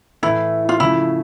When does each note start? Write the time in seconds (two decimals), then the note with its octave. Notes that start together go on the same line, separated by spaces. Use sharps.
0.23 A2 E3 A3 E4
0.69 F4
0.80 C#3 F3 A3 E4